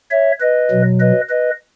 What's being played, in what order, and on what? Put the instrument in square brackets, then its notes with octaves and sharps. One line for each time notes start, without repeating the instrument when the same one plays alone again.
[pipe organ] C#5 E5
B4 D#5
B2 F#3
B4 D#5
B4 D#5